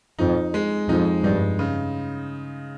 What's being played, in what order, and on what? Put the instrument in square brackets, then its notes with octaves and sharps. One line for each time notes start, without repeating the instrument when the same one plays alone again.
[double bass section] F2 [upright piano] D#4
[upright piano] G#3
[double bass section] F2 [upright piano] D#4
[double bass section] G2 [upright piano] D#4
[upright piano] C#3